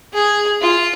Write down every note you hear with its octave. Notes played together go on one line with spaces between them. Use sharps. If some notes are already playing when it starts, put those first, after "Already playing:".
G#4
F4